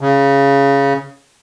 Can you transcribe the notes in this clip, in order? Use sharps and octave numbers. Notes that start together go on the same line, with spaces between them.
C#3